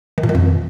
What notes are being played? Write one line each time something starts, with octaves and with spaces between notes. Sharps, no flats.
D#3
A#2
D#3
F2